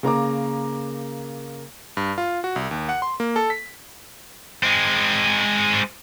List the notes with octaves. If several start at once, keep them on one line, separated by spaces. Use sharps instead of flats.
C#3 A#3 A#5 D6
G2
F4
F#4
C2
D#2
F#5
C6
A#3
A4
B6
G#3 C4